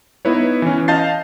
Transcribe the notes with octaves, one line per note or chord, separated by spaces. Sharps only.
B3 D#4 E4 B4 C#5
E3 C#4
D#5 F5 A5 G6 A6 C7